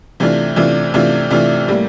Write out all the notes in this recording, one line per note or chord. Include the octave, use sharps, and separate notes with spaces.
C3 E3 A3 D4 F4
C3 E3 A3 D4 F4
C3 E3 A3 D4 F4
C3 E3 A3 D4 F4
A2 G3 A#3